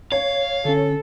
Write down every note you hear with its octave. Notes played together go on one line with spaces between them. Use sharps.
C#5 F5
D3 C#4 A4